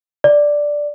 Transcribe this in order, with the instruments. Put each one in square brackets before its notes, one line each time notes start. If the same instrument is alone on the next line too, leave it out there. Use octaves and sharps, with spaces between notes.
[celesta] D5